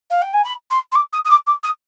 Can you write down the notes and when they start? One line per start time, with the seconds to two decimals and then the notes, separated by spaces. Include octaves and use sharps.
0.10 F5
0.22 G5
0.33 G#5
0.44 B5
0.70 C6
0.92 C6
0.95 D6
1.13 D#6
1.25 D#6
1.30 D6
1.47 D6
1.63 D#6